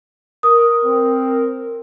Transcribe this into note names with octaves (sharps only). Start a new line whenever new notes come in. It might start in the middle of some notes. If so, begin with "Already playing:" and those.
A#4 D#6
C4